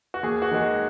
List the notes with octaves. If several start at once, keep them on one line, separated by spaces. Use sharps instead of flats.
F#4
D#2 G#4
F#4
D#3 G#3
G#4